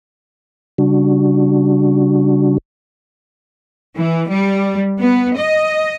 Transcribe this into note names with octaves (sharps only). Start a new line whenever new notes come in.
C#3 G3 D4 F#4
E3
G3
B3
D#5